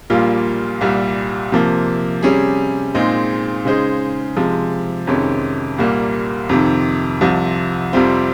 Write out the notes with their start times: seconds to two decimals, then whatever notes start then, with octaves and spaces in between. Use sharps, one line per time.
0.10 A#1 A#2 G3 A#3 F4
0.81 C2 A#2 G3
1.52 C3 F3 A#3
2.23 C3 G3 C#4 G#4
2.94 A#2 G#3 C4 D#4 G#4
3.65 C#3 G#3 D#4 G#4 C5
4.37 C3 F3 G#3
5.07 F2 C3 D#3 G#3 C#4
5.78 C2 A#2 G3 A#3
6.49 F2 C3 D#3
7.21 C2 C3 F3
7.93 F2 C3 G3 C4 F4